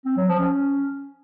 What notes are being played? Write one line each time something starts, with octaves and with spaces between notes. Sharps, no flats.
C4
F#3
F3
C#4